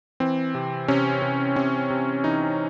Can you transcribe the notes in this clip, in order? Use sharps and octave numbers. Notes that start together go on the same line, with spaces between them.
E3 C4
C3
C3 C#4
C3
C3 C#4
C3
E3 D#4